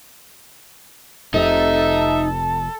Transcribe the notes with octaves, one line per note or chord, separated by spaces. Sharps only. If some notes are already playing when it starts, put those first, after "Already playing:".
F1 F2 C3 D#4 A4 E5